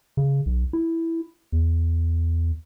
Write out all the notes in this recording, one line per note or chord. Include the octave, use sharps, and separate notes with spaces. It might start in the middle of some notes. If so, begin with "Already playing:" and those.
C#3
B1
E4
E2